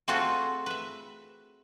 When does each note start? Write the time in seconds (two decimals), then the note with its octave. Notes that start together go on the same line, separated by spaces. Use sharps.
0.08 A3 C4 F4 F#4 G#4 A4
0.66 B4 E5